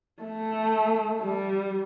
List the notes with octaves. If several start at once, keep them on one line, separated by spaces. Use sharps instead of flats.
A3
G3